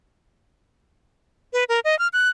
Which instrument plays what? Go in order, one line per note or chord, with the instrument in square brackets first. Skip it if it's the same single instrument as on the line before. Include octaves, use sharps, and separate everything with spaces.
[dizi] B4
A#4
D#5
F6
F#6